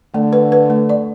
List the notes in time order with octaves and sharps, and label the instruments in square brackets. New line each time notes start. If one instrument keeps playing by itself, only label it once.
[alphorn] D3 [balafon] A3
[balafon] B4
B4
A3
D5